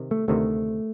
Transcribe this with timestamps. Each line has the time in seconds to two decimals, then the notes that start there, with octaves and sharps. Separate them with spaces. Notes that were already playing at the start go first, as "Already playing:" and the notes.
Already playing: C3 D#3
0.11 A3
0.28 D2 C3 D#3 A3